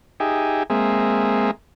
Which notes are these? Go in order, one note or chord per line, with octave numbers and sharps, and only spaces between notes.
D#4 G4 G#4 E5 G5 G#5
G#3 A#3 C4 G#4 E5